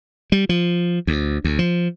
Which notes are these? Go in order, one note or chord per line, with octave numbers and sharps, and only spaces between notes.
G3
F3
D2
D2
F3